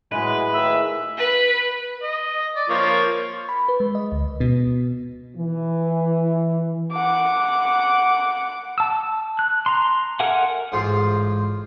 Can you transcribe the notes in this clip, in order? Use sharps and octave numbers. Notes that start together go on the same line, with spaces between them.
A2 E3 F#3 G#3 E4 B4 D#5
D#2 D#3 G#4 E5
B4
D#5
D5
F3 A#3 C#5
C#6
B5
B4
G#3
D#5
D2
B2
E3
F#5 D6
A5 E6
F#6
A#5 C6
A4 A#4 E5 F#5 G#5
A1 G#2 F4 C5 C6